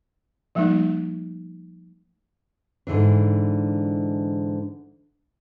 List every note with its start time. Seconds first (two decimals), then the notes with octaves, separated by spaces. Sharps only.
0.55 F3 G3 A3 A#3 D#4
2.87 G#2 D3 E3 D4